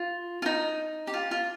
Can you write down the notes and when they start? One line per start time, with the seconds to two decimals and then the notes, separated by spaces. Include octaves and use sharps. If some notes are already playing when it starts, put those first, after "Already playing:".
Already playing: F4
0.42 F4
0.46 D#4
1.07 G4
1.14 F4
1.31 F4